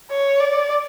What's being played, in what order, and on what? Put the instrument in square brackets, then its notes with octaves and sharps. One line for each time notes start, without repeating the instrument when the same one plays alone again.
[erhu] C#5
D5